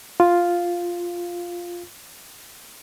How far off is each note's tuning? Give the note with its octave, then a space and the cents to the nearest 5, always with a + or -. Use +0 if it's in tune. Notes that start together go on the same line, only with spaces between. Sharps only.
F4 +0 F5 +0